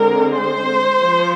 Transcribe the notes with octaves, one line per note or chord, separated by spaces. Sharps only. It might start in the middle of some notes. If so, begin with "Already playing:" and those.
Already playing: D3 G#3 C4 A#4
C5
F3